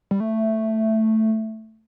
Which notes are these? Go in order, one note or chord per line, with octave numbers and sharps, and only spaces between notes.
G3
A3